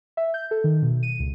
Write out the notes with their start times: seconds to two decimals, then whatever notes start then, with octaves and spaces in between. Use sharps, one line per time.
0.17 E5
0.34 G6
0.51 A4
0.64 D#3
0.82 B2
1.03 D#7
1.19 C#2